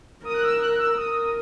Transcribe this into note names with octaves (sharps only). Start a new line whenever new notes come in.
A#4 D#6
F#6
E6
F#6
F#6
E6
A#4 D#6